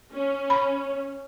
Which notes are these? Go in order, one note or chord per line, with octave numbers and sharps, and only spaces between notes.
C#4
B5